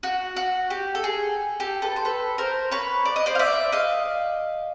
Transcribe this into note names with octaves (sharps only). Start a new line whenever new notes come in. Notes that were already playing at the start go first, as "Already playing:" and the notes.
F#4
F#4
G4
A4
G#4
G4 A4
A4 B4
C5
A4 B4
A#4 C5
B4 C#5
D5
D#5
C5 D5
F5
D5 E5
D#5 F5